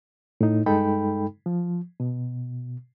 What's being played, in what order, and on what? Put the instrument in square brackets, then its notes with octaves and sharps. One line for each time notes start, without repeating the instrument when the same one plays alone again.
[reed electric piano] A2 D#4
G2 G#3 D#4 A4 G5 B5
F3
B2